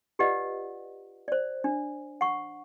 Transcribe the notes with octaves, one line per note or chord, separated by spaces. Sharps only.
F4 G4 B4 D5 D#5 F#5
C5 D5
D4
F#5 C#6